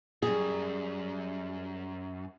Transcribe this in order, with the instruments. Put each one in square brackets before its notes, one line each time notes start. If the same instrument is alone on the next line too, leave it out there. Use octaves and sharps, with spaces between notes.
[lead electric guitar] F#2 [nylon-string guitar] G3 G#4